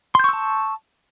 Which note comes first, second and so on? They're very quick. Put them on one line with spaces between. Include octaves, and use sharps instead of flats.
C6 G6 C#6 E6 A5